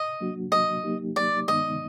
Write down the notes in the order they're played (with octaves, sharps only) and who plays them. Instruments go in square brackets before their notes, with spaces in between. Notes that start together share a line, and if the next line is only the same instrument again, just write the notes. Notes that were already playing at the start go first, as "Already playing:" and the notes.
Already playing: [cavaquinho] D#5
[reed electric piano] F#3 A#3 D4 F#4
[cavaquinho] D#5
[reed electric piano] F#3 A#3 D#4 G4
[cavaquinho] D5
[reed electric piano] G2 D#3 G#3 B3 D#4 [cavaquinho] D#5